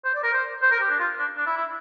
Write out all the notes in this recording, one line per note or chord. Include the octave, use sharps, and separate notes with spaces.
C5
D5
A#4
C5
C5
A#4
G4
D4
F4
D4
D4
E4
E4